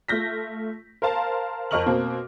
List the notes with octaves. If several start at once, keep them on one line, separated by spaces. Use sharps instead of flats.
A3 F4 G6 A#6 B6
A#4 C5 F5 A5
F2 A#4 D#5 C#6 F6 F#7
B2 A#3 C4